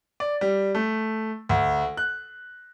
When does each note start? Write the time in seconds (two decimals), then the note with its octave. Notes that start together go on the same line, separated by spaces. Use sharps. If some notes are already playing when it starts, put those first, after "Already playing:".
0.20 D5
0.41 G3
0.75 A3
1.49 D2
1.97 F#6